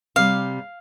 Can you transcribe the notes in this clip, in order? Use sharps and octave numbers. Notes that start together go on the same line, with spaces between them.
C3 G3 C4 F5